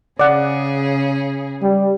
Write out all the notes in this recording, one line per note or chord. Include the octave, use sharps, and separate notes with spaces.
C#3 G#4 D5 F#5
G3